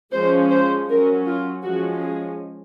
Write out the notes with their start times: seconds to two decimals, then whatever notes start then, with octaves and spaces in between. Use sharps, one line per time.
0.14 F3 G#3 C#4 C5
0.51 C5
0.88 F#3 C#4 A#4
1.26 F4
1.64 F3 G#3 C#4 F#4
2.01 G#4